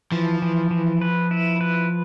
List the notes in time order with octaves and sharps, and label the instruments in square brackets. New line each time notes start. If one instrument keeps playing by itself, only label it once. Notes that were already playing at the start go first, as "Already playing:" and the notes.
[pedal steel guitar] E3 [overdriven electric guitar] F3
[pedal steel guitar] E3
E3
B4
E4
B4